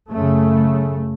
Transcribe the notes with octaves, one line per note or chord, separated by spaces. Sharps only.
F#2 C#3 A3